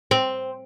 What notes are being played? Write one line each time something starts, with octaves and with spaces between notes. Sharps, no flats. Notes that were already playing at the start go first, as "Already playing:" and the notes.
C4